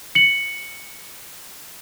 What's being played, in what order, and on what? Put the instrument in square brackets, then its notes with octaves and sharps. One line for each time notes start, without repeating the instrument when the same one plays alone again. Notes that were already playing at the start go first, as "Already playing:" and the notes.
[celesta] C#7 F#7